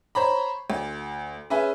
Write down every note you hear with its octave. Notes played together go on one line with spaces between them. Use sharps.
C5 C#5 A#5 B5
D2
C#4 G#4 B4 E5 G#5